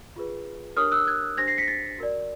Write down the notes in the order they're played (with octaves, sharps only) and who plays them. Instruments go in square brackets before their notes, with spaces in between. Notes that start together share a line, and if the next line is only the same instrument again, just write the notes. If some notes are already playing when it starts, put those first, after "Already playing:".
[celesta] F4 G#4 B4
D4 G4 A#4 C#5 D#6 F6
E6 F#6
F#6 G#6
D4 G4 C5 G#6 A#6
A#6 C7
B6 C#7
A#6
A6 B6
F#4 A#4 D5